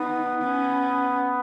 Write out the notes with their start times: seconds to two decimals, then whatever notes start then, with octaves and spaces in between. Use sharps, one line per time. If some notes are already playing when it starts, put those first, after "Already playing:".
Already playing: B3 D#4
0.43 C#4